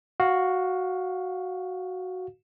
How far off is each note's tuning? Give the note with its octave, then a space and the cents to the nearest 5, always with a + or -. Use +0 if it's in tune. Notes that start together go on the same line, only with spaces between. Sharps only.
F#4 +0 F5 +15